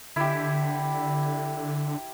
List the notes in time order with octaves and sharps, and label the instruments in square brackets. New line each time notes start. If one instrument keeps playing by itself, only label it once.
[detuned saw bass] D3 [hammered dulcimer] E4 G4